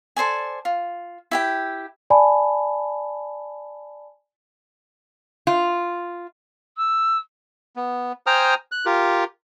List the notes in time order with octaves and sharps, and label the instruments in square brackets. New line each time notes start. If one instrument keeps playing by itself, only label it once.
[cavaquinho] A4 C5 D5 G#5
F4
E4 G4 G5
[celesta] D5 G#5 A5 B5
[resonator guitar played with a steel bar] F4
[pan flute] E6
[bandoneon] B3
C5 G5 G#5 A#5 D#6 F6
F#6
F4 G4 A#4